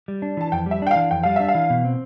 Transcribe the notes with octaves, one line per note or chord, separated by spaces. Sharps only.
G3
D4
E3 A5
F2 G5
G3
E5
D4 G5
F5
E3
F2 G5
G3 F5
D4 E5
F5
E3
B2
C4